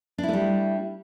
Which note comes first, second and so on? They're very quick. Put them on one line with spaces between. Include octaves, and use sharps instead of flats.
D4 E4 A3 G3